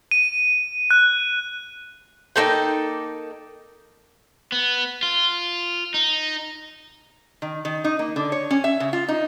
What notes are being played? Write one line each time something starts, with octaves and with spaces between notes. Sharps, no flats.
D#7
F#6
A#3 D#4 A4 G5
B3
F4
D#4
D#3
D#3
D#4
A#3
D3
C#5
C#4
E5
C#3
F4
D#4